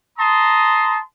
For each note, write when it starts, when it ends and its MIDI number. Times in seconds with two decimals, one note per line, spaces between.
0.19 1.01 81
0.19 1.01 82
0.19 1.01 84
0.19 1.01 87